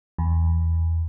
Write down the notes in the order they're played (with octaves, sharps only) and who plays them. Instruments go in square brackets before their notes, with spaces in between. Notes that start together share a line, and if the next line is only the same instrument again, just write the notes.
[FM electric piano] E2